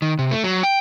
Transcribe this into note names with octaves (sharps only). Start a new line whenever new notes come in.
D#3
C3
A3
F#3
G5